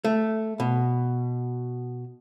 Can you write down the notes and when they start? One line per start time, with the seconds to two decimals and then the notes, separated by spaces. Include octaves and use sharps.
0.04 A3
0.60 B2